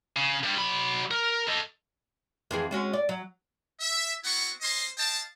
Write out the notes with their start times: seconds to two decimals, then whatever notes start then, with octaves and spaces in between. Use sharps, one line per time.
0.17 C#3
0.43 G2 G3
0.58 F#3 B5
1.11 A#4
1.47 A4 D#5
2.51 F2 E3 G#4
2.71 G#3 C#4 F#4
2.93 D5
3.09 F#3
3.80 E5
4.24 B3 C4 E4 F#4 F#5 C#6
4.61 C#4 C5 D#5 C6
4.98 D#5 F5 G5 A5